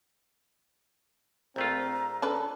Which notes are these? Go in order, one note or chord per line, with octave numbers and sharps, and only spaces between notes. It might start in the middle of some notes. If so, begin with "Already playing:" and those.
A#1 A3 C4 F4 A#5
C#4 D4 A4 B4